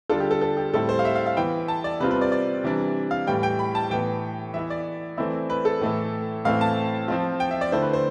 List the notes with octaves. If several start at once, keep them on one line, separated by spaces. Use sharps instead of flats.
D3 G3 D4 F4 A4
G4
A4
A4
G4
A2 G3 C4 E4 A4
C5
F5
E5
F5
F5
E3 B3 E4 G5
A5
D5
C3 G3 C4 F4 B4
B4
D5
D5
C3 E3 G3 D4
F5
A2 E3 G3 G5
G5
B5
A5
A2 E3 B3 G5
E3 B3 E4 E5
D5
E3 A3 C4 E4
B4
A4
A2 E3 A3 E4
A2 E3 A3 C4 E4 F5
A5
F3 C4 F4
G5
E5
D5
D3 A3 E4 C5
B4
C5